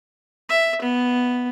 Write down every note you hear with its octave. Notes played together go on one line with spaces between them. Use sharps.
E5
B3